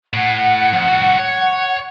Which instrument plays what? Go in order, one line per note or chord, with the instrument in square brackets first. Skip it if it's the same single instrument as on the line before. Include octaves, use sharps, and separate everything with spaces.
[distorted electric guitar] A2 [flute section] F#5
[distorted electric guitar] F2
C2 F#4
C#5